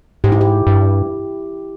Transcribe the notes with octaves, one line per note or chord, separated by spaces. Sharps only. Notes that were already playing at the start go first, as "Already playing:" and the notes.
G#2 G4
E4
G4
G2